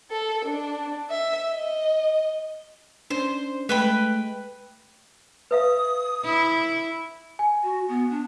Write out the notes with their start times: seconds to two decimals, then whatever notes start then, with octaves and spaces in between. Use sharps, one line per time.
0.11 A4
0.45 D4
1.10 E5
1.52 D#5
3.10 C#4 D4 C5
3.69 G#3 A3 B4 G5 B5
5.51 B4 E5 F5 D#6
6.25 E4
7.39 G#5
7.63 F#4
7.88 B3
8.10 D4